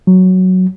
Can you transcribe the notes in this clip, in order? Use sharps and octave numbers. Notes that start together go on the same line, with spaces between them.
F#3